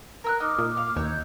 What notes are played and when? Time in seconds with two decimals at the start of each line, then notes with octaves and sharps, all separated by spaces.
0.24 A#4 E6 F#6
0.40 D#4 D6 D#6 F6
0.58 A#2
0.77 F5
0.96 D#2 D#4 C#5 E6 F#6 G6